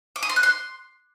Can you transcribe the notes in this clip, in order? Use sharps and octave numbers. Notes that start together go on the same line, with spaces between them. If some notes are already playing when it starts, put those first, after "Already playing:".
D6
D#6
C6
F#6
C6